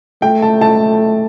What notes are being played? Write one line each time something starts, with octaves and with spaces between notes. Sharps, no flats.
A3 G5
A5
A5